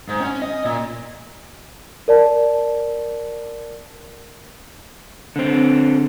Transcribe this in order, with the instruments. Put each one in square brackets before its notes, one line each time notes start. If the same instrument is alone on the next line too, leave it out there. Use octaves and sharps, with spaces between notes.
[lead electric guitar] G#2
C#4
D#5
A#2
[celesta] A#4 D5 A5
[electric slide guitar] D3 C4